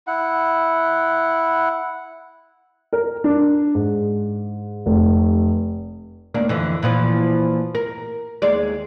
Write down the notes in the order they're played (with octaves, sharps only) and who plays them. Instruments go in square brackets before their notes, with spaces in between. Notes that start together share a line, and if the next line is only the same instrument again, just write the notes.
[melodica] E4 F#5
[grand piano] A#4
D4
G#2
F1
[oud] D#2 A#3 D4
F2 D3 E3
A#2 E3 F3
A#4
D#2 G#3 D5